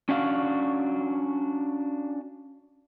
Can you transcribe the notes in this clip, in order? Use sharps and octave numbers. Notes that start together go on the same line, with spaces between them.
C#4 D4 F#4 F5